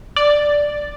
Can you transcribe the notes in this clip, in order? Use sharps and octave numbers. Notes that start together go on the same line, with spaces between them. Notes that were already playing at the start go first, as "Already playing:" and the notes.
D5